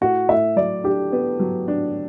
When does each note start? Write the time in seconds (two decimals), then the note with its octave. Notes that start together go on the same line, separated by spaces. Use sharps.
0.01 A2 F#4
0.29 A2 E5
0.56 F#3 D5
0.84 D4 G4
1.12 B3
1.40 F#3
1.68 D4